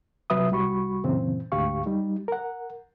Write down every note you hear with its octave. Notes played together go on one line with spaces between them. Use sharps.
C3 F#3 B4 E5 D#6
C2 G3 F#4 B5 C#6
F#2 A#2 C#3 E3 C4
D2 G#2 G4 F5 C#6
G3 D#4
A#4 F#5